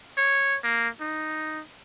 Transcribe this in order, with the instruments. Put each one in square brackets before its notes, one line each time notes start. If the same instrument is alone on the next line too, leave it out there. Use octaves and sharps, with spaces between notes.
[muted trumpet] C#5
A#3
D#4